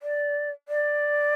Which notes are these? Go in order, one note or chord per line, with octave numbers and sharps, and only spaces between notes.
D5
D5